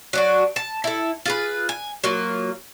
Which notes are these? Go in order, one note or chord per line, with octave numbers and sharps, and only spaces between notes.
F#3 D4 F#4
A5
E4 A4
F4 G#4 B4
G#5
F#3 A#3 F4